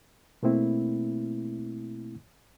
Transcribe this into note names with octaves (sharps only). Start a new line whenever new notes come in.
B2 A3 A#3 C4 E4